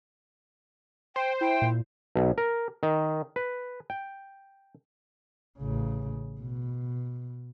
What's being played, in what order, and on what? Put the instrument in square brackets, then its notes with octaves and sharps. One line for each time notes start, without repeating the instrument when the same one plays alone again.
[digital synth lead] C5 [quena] G5
[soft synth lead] E4 [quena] G5
[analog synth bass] A#2
[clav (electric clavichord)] B1
A#4
D#3
B4
G5
[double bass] A1 C#3
B2